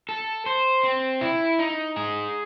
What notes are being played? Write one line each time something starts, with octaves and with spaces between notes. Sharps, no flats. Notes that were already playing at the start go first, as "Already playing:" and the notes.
A4
C5
C4
E4
D#4
G#4